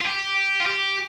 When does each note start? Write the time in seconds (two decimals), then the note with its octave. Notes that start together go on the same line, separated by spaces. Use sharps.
0.01 F4
0.05 G4
0.60 F4
0.66 G4